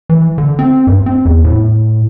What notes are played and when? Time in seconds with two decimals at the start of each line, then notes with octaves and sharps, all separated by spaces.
0.09 E3
0.38 D3
0.59 C4
0.87 G2
1.06 C4
1.25 E2
1.44 A2